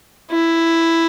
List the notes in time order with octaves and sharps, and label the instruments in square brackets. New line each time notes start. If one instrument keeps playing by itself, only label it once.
[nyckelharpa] E4